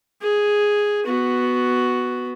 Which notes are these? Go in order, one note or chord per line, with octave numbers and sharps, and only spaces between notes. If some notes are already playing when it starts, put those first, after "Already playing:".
G#4
B3 F#4